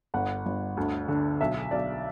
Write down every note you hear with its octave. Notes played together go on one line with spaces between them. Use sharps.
G1 F#5
G1
D2
D3
B1 E5
B1 D5